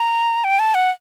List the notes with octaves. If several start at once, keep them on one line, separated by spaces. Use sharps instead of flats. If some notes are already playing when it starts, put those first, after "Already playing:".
Already playing: A#5
G5
A5
F#5